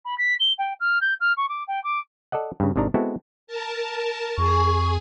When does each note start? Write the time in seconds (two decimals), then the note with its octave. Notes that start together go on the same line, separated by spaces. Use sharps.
0.05 B5
0.18 B6
0.40 G7
0.58 G5
0.80 F6
1.01 G6
1.20 F6
1.37 C#6
1.49 D6
1.68 G5
1.84 D6
2.32 A4 D5 D#5 F#5
2.60 G2 C#3
2.76 G#1 C3 D#3 D4 A#5
2.94 G#3 B3 C4 E4 F#4 A4
3.47 A#4 A5
4.38 F2 G#4 G#5 C#6